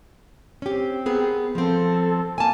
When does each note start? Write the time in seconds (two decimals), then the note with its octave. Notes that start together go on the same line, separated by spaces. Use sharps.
0.62 C4 C#4 G4
1.06 B3 G#4 A#4
1.55 F3 C4 A4
2.38 A#3 G#5 A5